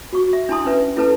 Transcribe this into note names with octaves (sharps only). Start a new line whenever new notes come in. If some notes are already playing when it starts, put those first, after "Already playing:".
F#4 C#6
E5
D4 E4 A5 C6 D#6
C#4 D#4 B4 E5
C#4 E4 A4 B4 A5